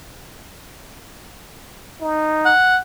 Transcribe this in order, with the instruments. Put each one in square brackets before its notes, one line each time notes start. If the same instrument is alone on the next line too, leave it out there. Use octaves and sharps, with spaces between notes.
[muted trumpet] D#4
[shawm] F#5